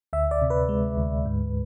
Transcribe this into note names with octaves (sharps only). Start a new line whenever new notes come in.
D2 E5
D5
C3
B4
G#3
D2
G#2